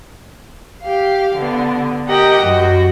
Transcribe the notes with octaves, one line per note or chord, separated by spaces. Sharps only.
G4 F5
D3 B3
G4 A#4 D#5 F#5 G5
F#2 F#4